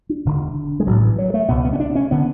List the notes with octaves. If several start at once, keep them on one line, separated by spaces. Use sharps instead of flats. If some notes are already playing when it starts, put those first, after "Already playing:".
D4
E1 D2 D3
G#3
A1 A2 F#3
E3
F#3
A3
C#2 B2 B3
B3
C#4
D4
C#4
D3 B3